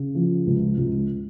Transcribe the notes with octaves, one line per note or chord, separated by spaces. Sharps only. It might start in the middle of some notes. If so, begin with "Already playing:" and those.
Already playing: C#3
F3
C#2
C#2